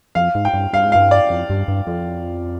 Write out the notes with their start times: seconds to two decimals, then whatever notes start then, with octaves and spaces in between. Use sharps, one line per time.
0.15 F2 F5
0.35 G#2
0.45 G5
0.54 G2
0.73 G2 F5
0.84 G#2
0.92 G2 F5
1.11 D5
1.30 F2
1.50 G2
1.68 G2
1.87 F2